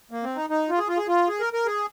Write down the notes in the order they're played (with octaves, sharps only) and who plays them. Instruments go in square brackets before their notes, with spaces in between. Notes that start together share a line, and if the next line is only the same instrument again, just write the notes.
[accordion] A#3
C4
D#4
D#4
F4
G#4
F4
G#4
F4
G#4
A#4
A#4
G#4